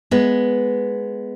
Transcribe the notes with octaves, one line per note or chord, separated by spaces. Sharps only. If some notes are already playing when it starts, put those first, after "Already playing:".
G#3 B3